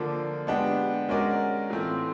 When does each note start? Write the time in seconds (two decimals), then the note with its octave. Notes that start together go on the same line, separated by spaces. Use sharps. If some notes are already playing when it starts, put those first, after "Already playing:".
Already playing: D3 F3 A#3 D4
0.47 G#3 B3 D4 G4
1.09 G#3 C#4 F#4 A#4 D5
1.70 A2 E3 A3 C4 F4